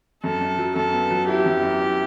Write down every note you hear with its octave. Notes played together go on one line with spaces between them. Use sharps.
F#2 A4
F#2
F#3
F#2 A4
B3
F#3
E4 G4
F#2
F#2
E4